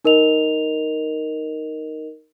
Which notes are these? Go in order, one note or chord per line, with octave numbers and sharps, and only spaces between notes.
D#4 A#4 D#5 F7